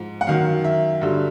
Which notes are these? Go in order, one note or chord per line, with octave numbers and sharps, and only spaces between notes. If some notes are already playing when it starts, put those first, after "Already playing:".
Already playing: G#2 F3
F#5
F#2 D#3 F#3 F5
E5
G2 D3 F#3